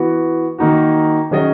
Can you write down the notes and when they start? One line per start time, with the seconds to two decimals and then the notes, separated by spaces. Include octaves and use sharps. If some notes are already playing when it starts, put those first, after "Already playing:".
Already playing: E3 B3 F#4
0.58 D#3 A#3 D#4 F#4
1.31 D#3 F#3 C#4 G#4 D#5